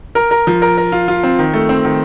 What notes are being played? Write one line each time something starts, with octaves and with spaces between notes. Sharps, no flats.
A#4
A#4
F3
A#4
A#4
F4
F4
C4
D#3
A3
C4
D#3